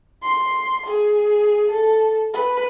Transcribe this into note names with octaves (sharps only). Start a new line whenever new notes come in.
C6
G#4
A4
B4